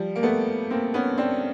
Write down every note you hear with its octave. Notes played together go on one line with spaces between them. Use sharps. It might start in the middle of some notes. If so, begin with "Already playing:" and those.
Already playing: F3 G3
A#3
A3 B3
A#3 C4
B3 C#4
C4 D4